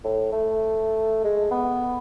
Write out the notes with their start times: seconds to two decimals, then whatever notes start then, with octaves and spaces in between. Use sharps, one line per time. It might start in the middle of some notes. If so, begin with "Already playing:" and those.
0.04 A2
0.32 A3
1.24 G#3
1.51 B3